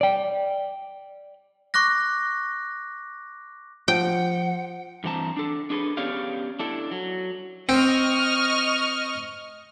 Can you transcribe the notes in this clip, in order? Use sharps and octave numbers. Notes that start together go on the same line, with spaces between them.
D5 G5
C#6 D6 F#6 A#6
F3 F#5 G5
G2 E3 C4 A5 A#5
D4 A4
D4 G#4 A4 B4
B3 C#4 G4 C#5 D5 F5
D4 E4 A4
F#3
C4 D#5 C#6 F6